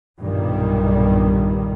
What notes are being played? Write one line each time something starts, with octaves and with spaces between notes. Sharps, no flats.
B1 G2 A#2 D#3 G3